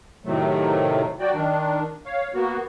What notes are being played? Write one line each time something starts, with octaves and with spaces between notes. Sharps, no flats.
A2 C3 D#3 F#3 A3
F#3 F#4 D5 G5
D#3 D4
C#5 F5
A#3 B3 F#4